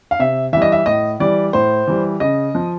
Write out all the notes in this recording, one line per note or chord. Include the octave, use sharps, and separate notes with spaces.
F5
C3 E5
E3 G3 E5
D#5
E5
A2 D#5
E3 G3 D5
A2 C5
E3 G3
C#3 D#5
F3